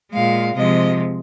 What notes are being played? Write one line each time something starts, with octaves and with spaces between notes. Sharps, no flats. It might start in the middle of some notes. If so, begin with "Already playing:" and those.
A#2 G#3 F5
C3 F3 G#3 D#5